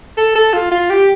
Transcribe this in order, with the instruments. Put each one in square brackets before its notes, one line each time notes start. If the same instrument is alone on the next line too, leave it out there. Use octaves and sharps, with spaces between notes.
[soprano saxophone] A4
A4
F4
F4
G4